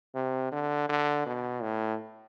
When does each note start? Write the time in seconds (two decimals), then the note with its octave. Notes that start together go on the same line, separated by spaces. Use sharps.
0.15 C3
0.52 D3
0.89 D3
1.26 B2
1.62 A2